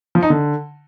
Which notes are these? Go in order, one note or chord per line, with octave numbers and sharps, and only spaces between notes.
F3
D#4
D3